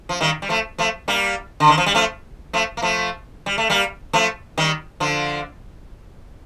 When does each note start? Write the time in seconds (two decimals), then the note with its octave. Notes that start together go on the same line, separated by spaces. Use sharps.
0.09 F3
0.21 D#3 G3
0.42 G3
0.49 F3 A3
0.78 F3 A3
1.08 G3 A#3
1.60 D3
1.69 D#3
1.78 F3
1.86 G3
1.95 F3 A3
2.53 F3 A3
2.77 A#3
2.82 F3 A3
3.46 G3
3.58 A3
3.70 G3 A#3
4.13 F3 A3
4.58 D#3 G3
5.00 D3 F3